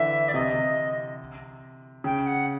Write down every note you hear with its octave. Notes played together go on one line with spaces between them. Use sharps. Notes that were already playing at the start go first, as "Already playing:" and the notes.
Already playing: D3 E3 E5
D5
C3 D#5
C3
C#3 G5
F#5